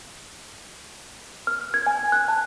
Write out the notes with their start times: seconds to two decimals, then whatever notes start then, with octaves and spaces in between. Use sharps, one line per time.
1.47 F6
1.74 G#6
1.86 G#5
2.12 F#6
2.28 A5